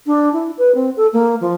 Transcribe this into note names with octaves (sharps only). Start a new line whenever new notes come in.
D4
E4
B4
C4
A4
A#3
F3